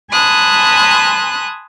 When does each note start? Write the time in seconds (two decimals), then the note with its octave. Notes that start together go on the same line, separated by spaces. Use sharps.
0.11 G#5 A5 B5 C6 D#6 F#6